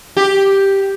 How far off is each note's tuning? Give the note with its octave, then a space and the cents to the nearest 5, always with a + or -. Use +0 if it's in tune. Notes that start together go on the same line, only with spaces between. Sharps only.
G4 +0